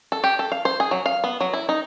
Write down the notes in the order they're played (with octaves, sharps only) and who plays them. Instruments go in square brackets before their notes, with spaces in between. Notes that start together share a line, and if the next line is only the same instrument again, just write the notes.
[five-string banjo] A4
G4
A4
F5
C5
G#4
F#3
F5
B3
F#3
E4
D#4